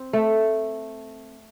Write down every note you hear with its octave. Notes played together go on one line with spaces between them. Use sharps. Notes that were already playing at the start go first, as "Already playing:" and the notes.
Already playing: C4
A3